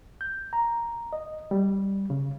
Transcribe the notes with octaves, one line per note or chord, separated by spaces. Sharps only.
G6
A#5
D#5
G3
C#3